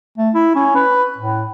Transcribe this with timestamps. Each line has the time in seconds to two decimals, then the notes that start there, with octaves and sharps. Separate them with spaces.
0.18 A3
0.34 E4
0.55 C#4
0.75 B4
1.18 A2